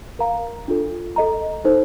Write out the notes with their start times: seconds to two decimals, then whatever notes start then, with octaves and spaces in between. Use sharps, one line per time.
0.19 A#4 F5 A#5
0.68 D4 F4 A4
1.16 A4 D#5 A#5
1.65 D#4 A4 C5